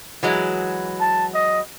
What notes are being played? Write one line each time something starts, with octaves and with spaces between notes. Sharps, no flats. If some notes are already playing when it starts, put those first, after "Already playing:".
E3 F#3 G#3
A5
D#5